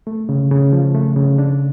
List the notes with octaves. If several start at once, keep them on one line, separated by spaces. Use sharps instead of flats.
A3
C#3
C#3
F3
A3
C#3
D4